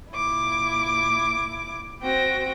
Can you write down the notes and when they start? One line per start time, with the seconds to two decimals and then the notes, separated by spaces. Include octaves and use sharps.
0.13 A#2 E4 D6
2.01 C4 F#4 G5 A#6